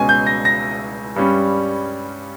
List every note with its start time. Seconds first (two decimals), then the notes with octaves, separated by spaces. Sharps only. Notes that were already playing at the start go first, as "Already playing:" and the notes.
Already playing: C#2 B2 G#3 C#4 G#5
0.09 G6
0.27 A#6
0.45 A#6
1.16 G2 G3 C#4